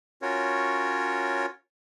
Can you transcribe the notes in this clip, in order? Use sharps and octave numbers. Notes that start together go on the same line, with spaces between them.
C#4 F4 F#4 A#4 C#5